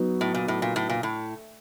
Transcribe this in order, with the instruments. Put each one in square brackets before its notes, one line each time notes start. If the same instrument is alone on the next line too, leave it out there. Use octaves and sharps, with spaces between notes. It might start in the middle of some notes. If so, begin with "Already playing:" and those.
Already playing: [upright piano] F#3 B3 D#4
[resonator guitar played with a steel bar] A2
A#2
A2
A#2
A2
A#2
A2